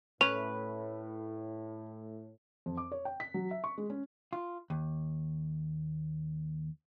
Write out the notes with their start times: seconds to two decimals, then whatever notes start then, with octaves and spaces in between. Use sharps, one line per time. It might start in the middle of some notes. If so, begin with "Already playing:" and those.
0.21 A2 C#4 B4 F7
2.66 F2
2.77 D6
2.92 C#5
3.05 G5
3.20 B6
3.34 F#3
3.51 E5
3.64 C#6
3.78 G#3
3.90 C#4
4.33 F4
4.70 D#2